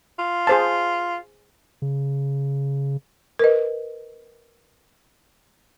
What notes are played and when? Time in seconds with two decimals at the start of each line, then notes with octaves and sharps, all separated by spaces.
0.19 F4
0.47 G#4 C5 A5
1.82 C#3
3.39 A#4 B4 D#5